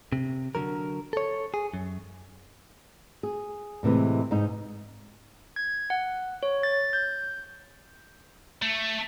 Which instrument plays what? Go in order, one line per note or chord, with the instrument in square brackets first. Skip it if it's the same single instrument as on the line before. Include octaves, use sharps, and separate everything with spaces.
[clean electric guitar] C3
D3 F#3 A#4
A4 C#5
G#4
F#2
[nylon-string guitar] G#4
A2 C3 E3 G#3
G#2 D#4
[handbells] G#6
F#5
C#5
A6
G6
[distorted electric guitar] A3